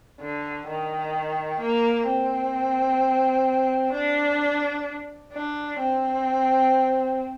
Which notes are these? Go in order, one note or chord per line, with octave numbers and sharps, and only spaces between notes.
D3
D#3
A#3
C4
D4
D4
C4